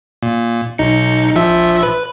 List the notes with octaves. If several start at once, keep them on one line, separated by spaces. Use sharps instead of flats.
A#2
B1 D#4 C#7
A#1 F3 E5
B4